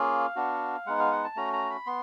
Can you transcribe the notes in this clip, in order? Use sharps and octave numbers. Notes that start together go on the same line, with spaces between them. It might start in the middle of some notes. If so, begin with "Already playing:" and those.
Already playing: A#3 C#4 F4 G#4 F5
B3 D4 F#4
G#3 B3 D#4 F#5
F5
F#5
A5
A3 C#4 F#4 A#5
A#5
B5
B3 C6